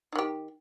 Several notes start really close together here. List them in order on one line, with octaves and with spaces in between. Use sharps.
D#4 D#3 G4